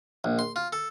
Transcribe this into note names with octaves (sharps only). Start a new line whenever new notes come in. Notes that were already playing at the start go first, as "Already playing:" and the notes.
A#1
C6
F4
A4